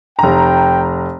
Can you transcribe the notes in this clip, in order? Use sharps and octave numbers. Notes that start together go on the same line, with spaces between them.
F1 G5 A#5